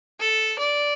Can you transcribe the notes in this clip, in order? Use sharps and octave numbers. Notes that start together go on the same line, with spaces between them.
A4
D5